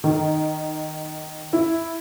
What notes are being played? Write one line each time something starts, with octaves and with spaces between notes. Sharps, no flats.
D#3
E4